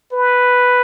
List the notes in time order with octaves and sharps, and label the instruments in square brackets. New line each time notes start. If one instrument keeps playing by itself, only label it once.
[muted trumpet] B4